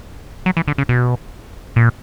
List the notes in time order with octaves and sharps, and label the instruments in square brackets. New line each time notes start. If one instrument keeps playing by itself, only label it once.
[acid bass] F#3
E3
D3
C#3
B2
A#2